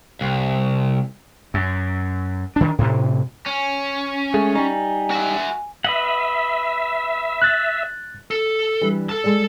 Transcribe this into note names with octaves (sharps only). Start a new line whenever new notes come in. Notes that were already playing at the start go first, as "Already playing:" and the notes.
C2
F#2
D#3 D4
A2 C3
C#4
G#3 A3 G#5
G3 D#4
F#4 E5
B4 D#5 E5 F#5
F#6 A6
A4
E3 G3 D4
A4 A5
G#3 G#4 D5